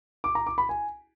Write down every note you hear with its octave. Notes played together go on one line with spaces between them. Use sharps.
D6
A#5
D6
B5
G#5